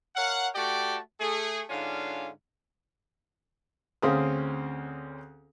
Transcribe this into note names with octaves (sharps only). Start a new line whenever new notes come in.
A#4 C#5 F5 F#5
A3 F#4 G4 D5 G5 A5
A3 G#4
G#2 D3 C#4 D4 F4 F5
D2 C4 C#4 G#4 F5 D#6